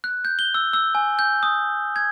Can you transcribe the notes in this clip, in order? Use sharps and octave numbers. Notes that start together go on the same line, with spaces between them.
F#6
G6
G7
E6
E6
G#5
G6
D#6
G#6